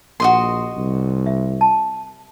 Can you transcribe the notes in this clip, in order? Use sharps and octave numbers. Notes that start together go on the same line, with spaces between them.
A#1 F#4 D#5 C6
C2
E5
A5